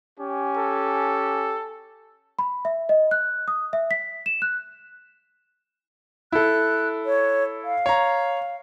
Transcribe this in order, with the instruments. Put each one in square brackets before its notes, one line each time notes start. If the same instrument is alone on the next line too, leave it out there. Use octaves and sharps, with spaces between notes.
[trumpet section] C#4 G4 G#5
[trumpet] A4
[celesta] B5
E5
D#5
F#6
D#6
E5
B6
E7
F#6
[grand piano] E4 A4 [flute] F#6
[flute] C#5
F5
[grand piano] C#5 A#5